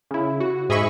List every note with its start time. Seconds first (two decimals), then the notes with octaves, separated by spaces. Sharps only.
0.11 C#3 E4
0.40 F#4
0.69 G#2 G#4 D#5 E5 B5 C#6